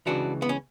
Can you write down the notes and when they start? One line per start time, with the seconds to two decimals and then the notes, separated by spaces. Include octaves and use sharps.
0.06 C#2 C#3 E3 D4 F#4
0.42 B3
0.49 C#4